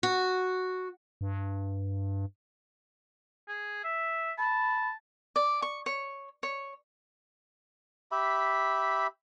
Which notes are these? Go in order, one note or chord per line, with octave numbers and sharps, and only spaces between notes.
F#4
G2
G#4
E5
A5 B5
D5
C#6
C#5
C#5
G4 E5 B5